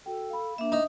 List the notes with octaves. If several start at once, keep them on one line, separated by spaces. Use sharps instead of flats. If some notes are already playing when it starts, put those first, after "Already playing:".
F#4 A4 G5
F5 B5
A#3 D4 E5
D#4 D#6